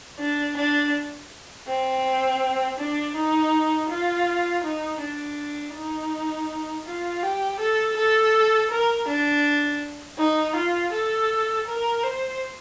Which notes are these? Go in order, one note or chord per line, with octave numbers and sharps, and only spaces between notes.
D4
D4
C4
D4
D#4
F4
D#4
D4
D#4
F4
G4
A4
A4
A#4
D4
D#4
F4
A4
A#4
C5